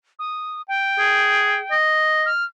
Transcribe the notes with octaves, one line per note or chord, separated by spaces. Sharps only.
D#6
G5
G#4
D#5
F6